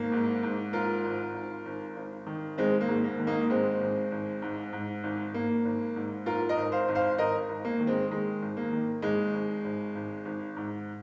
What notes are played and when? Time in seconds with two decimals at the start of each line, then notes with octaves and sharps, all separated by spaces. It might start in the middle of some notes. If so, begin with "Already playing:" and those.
Already playing: G#1 A#3
0.12 G#2
0.43 G#2
0.73 G#1 F4 A#4
1.04 G#1
1.34 G#1
1.66 G#1
1.97 G#1
2.27 D#3
2.58 G#1 G#3 C4
2.81 A#3
2.88 G#2
3.04 A#3
3.19 D#3
3.27 A#3 D#4
3.50 G#1 G#3 C4
3.81 G#1
4.12 G#1
4.42 G#2
4.73 G#2
5.03 G#1
5.34 G#1 A#3
5.65 G#1
5.96 G#2
6.26 G#1 F4 A#4
6.49 A#4 D#5
6.57 G#1
6.72 C5 F5
6.88 G#1
6.95 C5 F5
7.18 G#1 A#4 D#5
7.49 G#1
7.65 A#3
7.80 D#3
7.87 G#3 C4
8.11 D#3 G#3
8.42 G#1
8.57 A#3
8.72 D#3
9.02 G#1 G#3
9.34 G#1
9.64 G#1
9.95 G#1
10.25 G#1
10.57 G#2